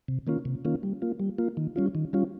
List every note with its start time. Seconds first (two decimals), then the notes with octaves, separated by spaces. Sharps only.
0.08 C3
0.27 D#3 A#3 C#4 F4
0.45 C3
0.65 D#3 A#3 C#4 F4
0.83 G3
1.02 A#3 F4
1.20 G3
1.38 A#3 F4
1.57 D#3
1.76 G3 C#4 F4
1.95 D#3
2.13 G3 C#4 F4